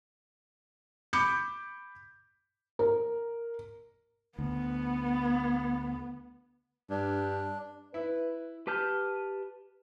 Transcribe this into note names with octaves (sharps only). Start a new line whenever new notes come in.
B5 D6 G6 C#7
A#4
D2 B3
G2 D4
E4 B4
G4 B4 A5 F6 G6